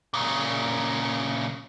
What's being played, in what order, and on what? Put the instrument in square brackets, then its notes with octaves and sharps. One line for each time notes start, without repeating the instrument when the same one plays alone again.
[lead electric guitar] A#2 C#3